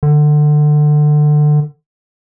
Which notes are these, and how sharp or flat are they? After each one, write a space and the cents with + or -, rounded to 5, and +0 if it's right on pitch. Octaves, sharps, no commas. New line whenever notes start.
D3 +25